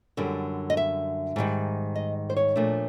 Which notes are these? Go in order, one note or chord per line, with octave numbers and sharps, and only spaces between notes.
F#2 D3 G3
D#5
E5
G#2 D#3 G3
D#5
C5
C#5
A#2 F3 A3 D4